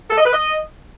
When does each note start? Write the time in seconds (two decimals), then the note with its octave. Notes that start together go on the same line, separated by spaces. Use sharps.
0.10 A4
0.18 D#5
0.25 B4
0.33 D#5